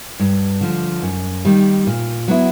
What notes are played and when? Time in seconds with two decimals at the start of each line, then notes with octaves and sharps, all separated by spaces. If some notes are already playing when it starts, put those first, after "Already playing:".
0.19 G2
0.61 D3 F3
1.02 F#2
1.45 D#3 G3 A#3
1.87 A#2
2.28 F#3 B3 E4